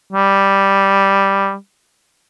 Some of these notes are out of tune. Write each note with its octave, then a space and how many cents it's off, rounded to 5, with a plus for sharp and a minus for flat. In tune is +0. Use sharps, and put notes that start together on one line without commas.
G3 +0